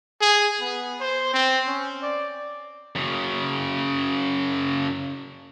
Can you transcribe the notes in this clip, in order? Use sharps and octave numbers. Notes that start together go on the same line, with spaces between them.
G#4
B3
C5
C4
C#4
D5
F#2 C#3